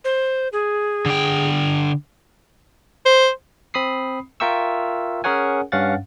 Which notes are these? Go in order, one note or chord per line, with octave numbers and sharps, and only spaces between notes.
C5
G#4
D3 G5
C5
C4 B5 D#6 C7
F4 A#4 E5 G5 C#6 E6
C#4 G#4 A#4 C#5 F#5 G#5
G2 C#4 F5 F#5 A6